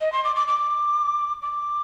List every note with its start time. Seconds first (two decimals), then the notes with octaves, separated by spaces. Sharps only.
0.01 D#5
0.12 C6
0.24 D6
0.36 D6
0.48 D6
1.42 D6